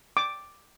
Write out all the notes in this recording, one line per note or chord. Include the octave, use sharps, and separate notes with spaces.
D6